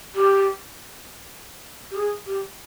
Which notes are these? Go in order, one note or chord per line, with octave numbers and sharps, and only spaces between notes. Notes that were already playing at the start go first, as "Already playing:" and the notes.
G4
G4
G#4
G4